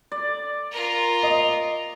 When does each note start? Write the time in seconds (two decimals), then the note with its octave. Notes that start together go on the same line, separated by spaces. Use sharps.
0.12 D5
0.71 F4 A#4
1.23 D#5